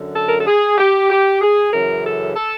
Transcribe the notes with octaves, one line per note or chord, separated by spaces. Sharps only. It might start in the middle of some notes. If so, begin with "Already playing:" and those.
Already playing: F#2 D3
A4
A#4
A4
G#4
G4
G4
G#4
F#2 C#3 E3 A#4
A4
A4